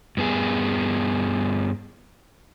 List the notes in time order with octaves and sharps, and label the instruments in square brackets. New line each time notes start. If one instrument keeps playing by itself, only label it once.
[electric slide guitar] G2 B3 G#4